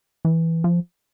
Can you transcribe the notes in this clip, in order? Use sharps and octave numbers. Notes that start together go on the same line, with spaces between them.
E3
F3